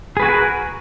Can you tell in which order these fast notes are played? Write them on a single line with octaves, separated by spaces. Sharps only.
G#4 B4 F#4 G#5 A#4